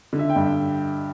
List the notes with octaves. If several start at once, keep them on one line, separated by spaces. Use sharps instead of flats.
D3
E5
G5
G2